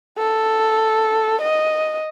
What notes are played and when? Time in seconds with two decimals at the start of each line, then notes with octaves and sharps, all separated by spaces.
0.18 A4
1.41 D#5